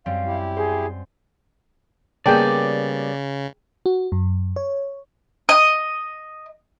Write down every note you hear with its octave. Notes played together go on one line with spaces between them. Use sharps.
F#2 G3 C4 F5
E4 G4
G#4 C5 C6
C#3 G3 A#3 B3 G#4 D5 G5 A5
F#4
F#2
C#5
D#5